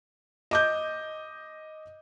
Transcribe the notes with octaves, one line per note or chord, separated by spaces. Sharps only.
D#5 D6 G6